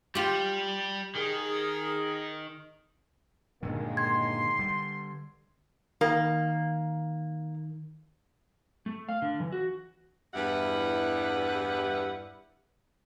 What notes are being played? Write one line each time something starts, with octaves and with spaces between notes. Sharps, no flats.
G3 F4 G4
D#3 G#4 A#4
G2 A#2 D3 D#3 G#3 A#3
C6 G#6
D3 G3
D#3 A#3
A3
F5
D3
E3
F#4
E2 G2 G3 E4 B4 F#5